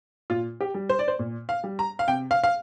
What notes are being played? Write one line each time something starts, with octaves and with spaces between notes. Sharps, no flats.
A#2 F4
G4
G3
C5
D5
C5
A#2
F5
G3
A#5
F5
C3 G5
F5
F5